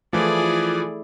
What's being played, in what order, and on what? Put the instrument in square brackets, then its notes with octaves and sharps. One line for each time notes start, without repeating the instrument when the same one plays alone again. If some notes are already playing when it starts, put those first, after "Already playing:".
[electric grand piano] E3 F3 [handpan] A3 E4 [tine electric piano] F4 [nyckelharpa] G#4 D5